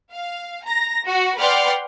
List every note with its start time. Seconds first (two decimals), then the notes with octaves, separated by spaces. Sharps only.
0.12 F5
0.65 A#5 A#6
1.06 F#4
1.39 B4 D5 F#5 G5 C6 F6